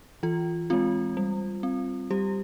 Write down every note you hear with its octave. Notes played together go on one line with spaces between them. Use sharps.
E3 F4
G#3 C4 F4
G3
C4
G3 G4